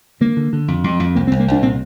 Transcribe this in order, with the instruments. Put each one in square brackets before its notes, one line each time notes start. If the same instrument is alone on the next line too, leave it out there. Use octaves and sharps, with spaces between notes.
[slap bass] D3 A#3
D3
D3
F2
F2
F2
C2 A#3
C4
C2
A#3
C2 D4
A#2 C4